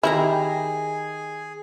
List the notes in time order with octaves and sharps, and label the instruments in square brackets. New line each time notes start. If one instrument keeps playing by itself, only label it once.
[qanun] D#3 G4 A#5 [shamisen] E4 [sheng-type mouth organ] G#4